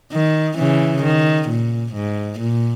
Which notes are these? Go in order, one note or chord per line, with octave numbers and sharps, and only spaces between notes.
D#3
C#3 E3
D#3
A#2
G#2
A#2